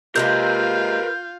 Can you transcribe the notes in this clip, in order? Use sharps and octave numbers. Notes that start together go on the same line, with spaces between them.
C3 G#3 A#3 F4 A#4 B4 F5 G6